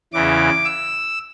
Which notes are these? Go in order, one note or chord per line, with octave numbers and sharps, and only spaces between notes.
E2 C#3 E3 D6
E6